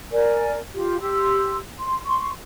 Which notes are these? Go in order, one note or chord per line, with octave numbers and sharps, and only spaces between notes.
A#4 D5 G#5
F4 G4
G4 C6 E6
C6
C6 C#6